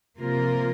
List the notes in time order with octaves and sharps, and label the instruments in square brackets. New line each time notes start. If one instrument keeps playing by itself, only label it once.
[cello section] C3 F3 A#3 F4 A#4